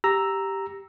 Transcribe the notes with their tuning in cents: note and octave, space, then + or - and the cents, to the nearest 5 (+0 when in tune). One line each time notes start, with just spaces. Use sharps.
G4 +0 A#5 +0 E6 +0